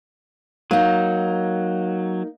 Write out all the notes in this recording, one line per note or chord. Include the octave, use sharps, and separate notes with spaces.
F#3 A#3 D#4